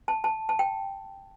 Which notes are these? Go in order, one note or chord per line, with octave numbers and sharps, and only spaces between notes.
A5
A5
A5
G5